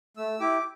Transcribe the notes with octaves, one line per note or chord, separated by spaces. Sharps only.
A3 E6
E4 G4 D6